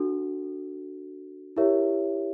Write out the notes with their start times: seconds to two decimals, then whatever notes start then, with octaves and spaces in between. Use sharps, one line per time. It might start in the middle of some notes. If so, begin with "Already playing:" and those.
Already playing: D4 F#4 A4
1.57 E4 G4 A#4 C#5 E5